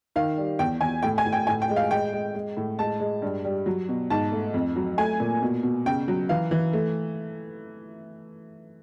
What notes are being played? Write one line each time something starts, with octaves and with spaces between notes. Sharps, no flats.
D#3 F5
G3
E2 G5
E2 G#5
A2 G5
G#5
A2
G5
A2 G#5
G5
G#3
F5
G#3 G5
G#3
G#3
A2
G#3 A5
G#3
G2
G3
F#3
B2
G#2 A5
A3
F2
F#3
A3 G#5
A#2
B2
B2
C#3 G5
F#3
E3 F5
E3
A3